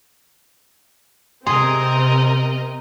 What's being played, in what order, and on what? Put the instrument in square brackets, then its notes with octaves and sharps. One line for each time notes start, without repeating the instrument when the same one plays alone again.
[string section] C3 C4 [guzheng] G#4 [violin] A#4 D#5 [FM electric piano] C6